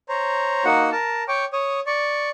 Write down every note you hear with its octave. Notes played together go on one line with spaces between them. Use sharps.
C5 C#5 A#5
A#3 D#4 F#4 F#5
A#4 A5
C#5 G5 C#6 D6
C#5 D#6
D5 C#6